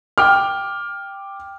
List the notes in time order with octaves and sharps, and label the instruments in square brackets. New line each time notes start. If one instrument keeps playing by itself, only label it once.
[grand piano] G5 D6 F6